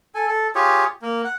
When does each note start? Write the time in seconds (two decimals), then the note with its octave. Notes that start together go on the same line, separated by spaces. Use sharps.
0.15 A4 G#5
0.27 A4
0.55 F4 G4 G#4 C#5
1.02 A#3
1.24 F#5